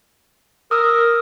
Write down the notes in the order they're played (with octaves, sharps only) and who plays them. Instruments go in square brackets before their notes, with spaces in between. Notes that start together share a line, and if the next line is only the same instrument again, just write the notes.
[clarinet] A#4 [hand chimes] D#6 E6